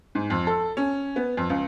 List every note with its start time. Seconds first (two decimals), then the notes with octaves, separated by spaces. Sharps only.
0.15 G#2
0.30 F2
0.47 A4
0.77 C#4
1.16 B3
1.37 F2
1.50 C#2